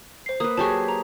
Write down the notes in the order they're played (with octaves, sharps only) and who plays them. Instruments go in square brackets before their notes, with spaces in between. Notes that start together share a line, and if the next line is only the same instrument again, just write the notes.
[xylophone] C5 C7
[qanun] A#3 B4 [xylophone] D#6
[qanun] F#3 G4 G#4 [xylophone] A5 C#6
[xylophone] A#5